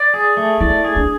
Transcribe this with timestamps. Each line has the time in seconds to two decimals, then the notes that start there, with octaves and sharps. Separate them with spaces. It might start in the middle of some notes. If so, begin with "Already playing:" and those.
Already playing: D5
0.14 G#4
0.37 A3
0.60 E4 D5
0.84 G#4
0.96 D4